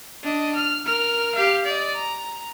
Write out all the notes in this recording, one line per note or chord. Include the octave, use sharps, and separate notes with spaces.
D4 D#5
F6
A#4 F6
G4 F5
D5 D#5
A#5